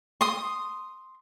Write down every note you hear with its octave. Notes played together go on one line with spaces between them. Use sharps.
C6 D#6